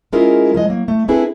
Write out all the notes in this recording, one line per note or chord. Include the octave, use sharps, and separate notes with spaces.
G#3 C#4 E4 F4 G#4 A#4
F3 G#3 D#5
F#3 A#3
A3
C4 D4 E4 G#4 A4 B4